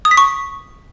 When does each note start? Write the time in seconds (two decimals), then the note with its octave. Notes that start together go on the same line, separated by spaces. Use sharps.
0.05 D#6
0.11 B6
0.17 C#6